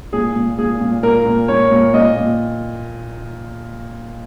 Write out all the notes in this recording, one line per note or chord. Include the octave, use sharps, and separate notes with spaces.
A#2 G#4
A#2
A#2 G#4
A#2
A#2 A#4
A#2
A#2 C#5
A#2
A#2 D#5
A#2